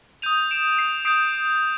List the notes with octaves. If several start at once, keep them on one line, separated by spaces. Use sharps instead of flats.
D#6 G6 D#7 F7
D7 E7
C7
D#6 G6 C7 D7